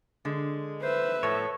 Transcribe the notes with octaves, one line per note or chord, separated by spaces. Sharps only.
D3 G#3
B4 C5 E5
A2 F3 A4 C#5